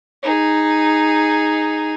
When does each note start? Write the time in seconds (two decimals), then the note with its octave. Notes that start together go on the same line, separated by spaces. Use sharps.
0.23 D#4 G#4